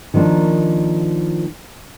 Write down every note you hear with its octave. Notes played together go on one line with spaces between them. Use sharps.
D#3 F3 A#3 D4